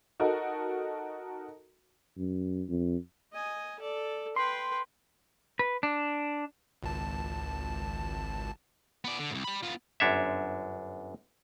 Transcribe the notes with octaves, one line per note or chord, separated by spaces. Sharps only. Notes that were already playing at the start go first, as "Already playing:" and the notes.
D#4 F#4 A4 A#4
F#2
F2
D#5 G#5
A4 D5
B4 G5 C6
B4
D4
G#1 C#2 A5
B3 D5
D3
C2 G#2
G3 B5
B3 F4
G1 F#2 D4 C#5 E5